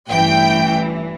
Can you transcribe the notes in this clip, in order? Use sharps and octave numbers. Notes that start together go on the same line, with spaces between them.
A1 G2 E3 G5